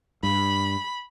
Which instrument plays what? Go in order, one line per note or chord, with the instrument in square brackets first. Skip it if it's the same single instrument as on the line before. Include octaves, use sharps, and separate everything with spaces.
[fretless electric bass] G2 [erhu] B5